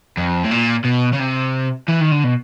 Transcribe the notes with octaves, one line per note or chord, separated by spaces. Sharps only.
F2
A2
A#2
B2
C#3
C3
E3
D#3
D3
B2